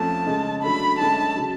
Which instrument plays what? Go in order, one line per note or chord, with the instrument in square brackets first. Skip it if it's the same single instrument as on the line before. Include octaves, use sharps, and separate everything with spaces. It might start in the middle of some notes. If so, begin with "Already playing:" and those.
Already playing: [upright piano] F2 F3 A3 C#4 [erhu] A5
[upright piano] C#3 G#3 C#4
[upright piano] D3 F#3 A3 D4 [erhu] B5
[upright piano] F#2 D3 G#3 C#4 [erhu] A5
[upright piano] C#3 F#3